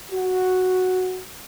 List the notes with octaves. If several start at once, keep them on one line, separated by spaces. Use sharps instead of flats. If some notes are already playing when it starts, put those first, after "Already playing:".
F#4